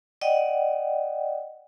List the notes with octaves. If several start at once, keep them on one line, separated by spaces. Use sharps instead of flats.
D5 D#5 F#5 G5